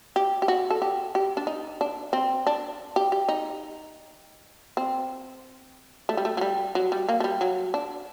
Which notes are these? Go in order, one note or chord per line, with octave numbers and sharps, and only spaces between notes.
G4
G4
F#4
A4
G4
G4
D4
D#4
D4
C4
D4
G4
G4
D#4
C4
A3
G3
A3
F#3
G3
F#3
G3
A#3
A3
G3
F#3
D4